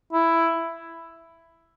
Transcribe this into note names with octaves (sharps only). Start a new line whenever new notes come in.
E4